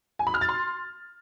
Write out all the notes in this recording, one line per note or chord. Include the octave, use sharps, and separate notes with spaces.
G#5
B5
F6
A6
C6